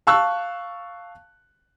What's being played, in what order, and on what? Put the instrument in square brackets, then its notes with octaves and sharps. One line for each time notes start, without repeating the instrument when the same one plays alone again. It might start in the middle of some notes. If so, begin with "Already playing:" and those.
[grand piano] F5 A5 C#6 E6 F#6